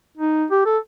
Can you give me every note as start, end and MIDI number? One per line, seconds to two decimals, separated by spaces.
0.17 0.45 63
0.50 0.61 67
0.66 0.78 69